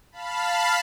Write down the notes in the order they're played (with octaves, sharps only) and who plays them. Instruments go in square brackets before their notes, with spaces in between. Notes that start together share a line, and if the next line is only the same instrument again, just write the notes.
[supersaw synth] F5 A5 B5